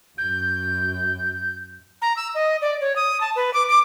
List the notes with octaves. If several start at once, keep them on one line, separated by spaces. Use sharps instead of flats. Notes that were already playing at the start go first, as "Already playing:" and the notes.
F#2 G6
A#5
E6
D#5
D5
C#5
D#6
A5
B4
D6
D6